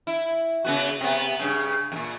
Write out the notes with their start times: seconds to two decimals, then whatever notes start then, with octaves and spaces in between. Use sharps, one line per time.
0.07 E4
0.65 C#3 B3 F#4
1.01 C3 B3
1.39 G2 C#3
1.92 F2 A#2